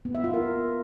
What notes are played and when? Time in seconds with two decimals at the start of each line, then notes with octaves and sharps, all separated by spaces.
0.05 B3
0.15 E5
0.24 F4
0.34 A#4